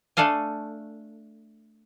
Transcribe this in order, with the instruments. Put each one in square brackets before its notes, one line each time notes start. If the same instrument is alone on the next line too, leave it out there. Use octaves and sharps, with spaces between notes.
[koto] A3 D4 A4 F5 G#5